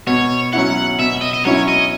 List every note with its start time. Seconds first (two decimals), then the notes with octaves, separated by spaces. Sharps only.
0.07 B2 C#5
0.53 F#3 C#4 E4 F#5
0.99 B2 E5
1.21 D#5
1.33 D#5
1.45 F#3 C#4 E4 C#5
1.68 D#5